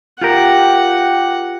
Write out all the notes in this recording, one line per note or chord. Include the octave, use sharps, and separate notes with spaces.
F4 G4 A#4 F#5 G5 D6